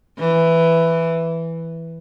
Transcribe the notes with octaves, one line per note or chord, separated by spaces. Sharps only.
E3